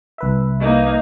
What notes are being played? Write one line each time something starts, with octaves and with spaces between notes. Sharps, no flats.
C2 B4 E5
A#3 D#4 D#5